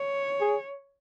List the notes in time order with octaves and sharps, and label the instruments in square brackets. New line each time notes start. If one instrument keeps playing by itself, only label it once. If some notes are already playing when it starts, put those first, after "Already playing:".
Already playing: [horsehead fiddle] C#5
[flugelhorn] G#4